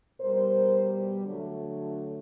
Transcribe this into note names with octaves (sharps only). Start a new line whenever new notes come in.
B2 G3 A#4 C5
D3 F#3 A3